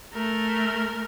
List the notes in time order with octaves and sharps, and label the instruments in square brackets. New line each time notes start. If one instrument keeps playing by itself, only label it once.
[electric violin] A3 A#4